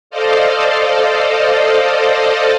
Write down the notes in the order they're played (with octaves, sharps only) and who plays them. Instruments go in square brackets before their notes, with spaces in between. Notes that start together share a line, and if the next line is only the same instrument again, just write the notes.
[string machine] A4 C5 D5 D#5 F5